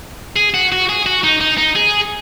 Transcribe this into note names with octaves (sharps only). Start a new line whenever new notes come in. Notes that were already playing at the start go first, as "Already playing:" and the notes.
G#4
F#4
F#4
G#4
F#4
D#4
D#4
D#4
G#4